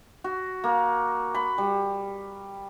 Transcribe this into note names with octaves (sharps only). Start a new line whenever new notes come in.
F#4
A#3
B5
G3